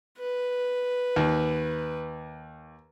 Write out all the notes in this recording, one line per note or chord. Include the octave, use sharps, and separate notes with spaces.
B4
D#2